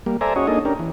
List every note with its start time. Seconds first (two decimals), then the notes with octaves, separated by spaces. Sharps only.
0.06 G3 A#3
0.21 A4 C5 D5 E5 G#5 A#5
0.36 C#4 F#4 G#4 C#5 D#5
0.47 A#3 D4 D#4 G#4 A4 D#5
0.65 C#4 D4 G4 A#4
0.79 E3